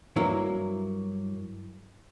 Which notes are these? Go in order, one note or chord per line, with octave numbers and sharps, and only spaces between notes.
G2 F#3 A#3 E4